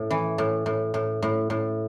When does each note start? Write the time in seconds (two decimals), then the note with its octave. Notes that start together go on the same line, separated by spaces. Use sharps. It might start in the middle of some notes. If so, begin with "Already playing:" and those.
Already playing: A2
0.10 E3
0.38 A2
0.66 A2
0.94 A2
1.22 A2
1.50 A2